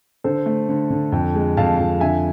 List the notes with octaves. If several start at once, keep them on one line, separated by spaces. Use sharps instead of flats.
D3 A4 C5
A3
D3
D3
F2
G#3
F2 F5 A5
F2
D3 E5 G#5